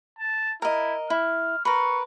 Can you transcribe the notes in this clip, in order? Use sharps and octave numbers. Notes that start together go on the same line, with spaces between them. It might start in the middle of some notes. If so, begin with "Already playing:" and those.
A5
E4 A#4 D#5
E4 F6
A#4 B4 C#6